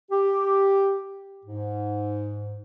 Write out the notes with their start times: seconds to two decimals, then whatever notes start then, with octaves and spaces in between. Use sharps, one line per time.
0.11 G4
1.44 G#2